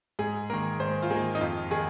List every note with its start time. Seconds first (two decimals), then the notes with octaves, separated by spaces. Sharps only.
0.19 G#2 G#4
0.50 D#3 A#3 A#4
0.80 G#2 C5
1.03 F4
1.10 D#3 A#3 G#4
1.35 D#4
1.41 F2 F4
1.71 D#3 G#4